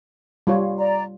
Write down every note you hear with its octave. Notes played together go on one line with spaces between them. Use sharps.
G3 F4 C#5
D5 A#5